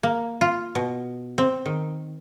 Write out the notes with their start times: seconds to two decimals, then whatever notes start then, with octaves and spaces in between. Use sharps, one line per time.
0.03 A#3
0.41 F4
0.75 B2
1.38 C4
1.66 D#3